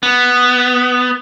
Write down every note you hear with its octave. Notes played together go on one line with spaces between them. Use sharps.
B3